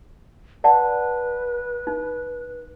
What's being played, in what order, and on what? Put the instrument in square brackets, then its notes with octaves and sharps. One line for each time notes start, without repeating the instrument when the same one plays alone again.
[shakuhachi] B4 [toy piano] D5 F#5 A5
[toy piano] D#4